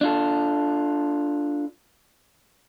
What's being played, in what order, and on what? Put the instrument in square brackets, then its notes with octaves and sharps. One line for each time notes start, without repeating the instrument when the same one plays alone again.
[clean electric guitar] D4 F4 A4